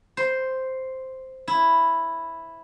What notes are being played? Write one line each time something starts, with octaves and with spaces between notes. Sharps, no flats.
C5
E4